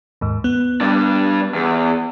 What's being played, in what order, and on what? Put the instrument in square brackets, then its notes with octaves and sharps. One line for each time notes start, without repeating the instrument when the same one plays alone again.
[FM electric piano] D#2 G#2
B3
[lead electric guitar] G2 D4
E2